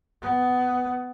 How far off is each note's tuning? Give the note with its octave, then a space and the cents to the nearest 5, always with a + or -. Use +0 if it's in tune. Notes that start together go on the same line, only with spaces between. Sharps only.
B3 +15